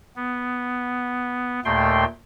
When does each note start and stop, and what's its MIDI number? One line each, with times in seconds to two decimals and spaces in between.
0.16 1.60 59
1.65 2.04 39
1.65 2.04 46
1.65 2.04 57
1.65 2.04 79
1.65 2.04 84